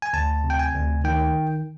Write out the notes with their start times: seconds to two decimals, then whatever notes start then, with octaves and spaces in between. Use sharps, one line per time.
0.02 G#5
0.13 D2 A5
0.44 C3
0.50 G5
0.59 G#5
0.75 D2
1.04 D#3 G5